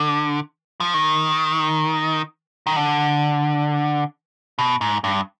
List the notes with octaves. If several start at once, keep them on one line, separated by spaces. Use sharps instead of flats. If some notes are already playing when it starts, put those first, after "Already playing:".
Already playing: D3
F3
D#3
D#3
D3
B2
G#2
G2